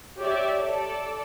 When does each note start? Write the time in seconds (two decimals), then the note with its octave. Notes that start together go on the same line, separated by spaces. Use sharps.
0.19 G4 C#5 D5 E5
0.61 A4 D5